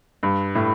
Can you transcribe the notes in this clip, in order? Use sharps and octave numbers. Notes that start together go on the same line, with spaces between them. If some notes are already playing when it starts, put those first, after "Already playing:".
G2
A2